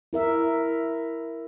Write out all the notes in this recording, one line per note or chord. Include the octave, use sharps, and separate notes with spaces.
E4 A#4 E5